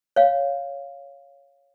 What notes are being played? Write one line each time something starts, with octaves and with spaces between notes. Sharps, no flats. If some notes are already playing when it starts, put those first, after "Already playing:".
C#5 F5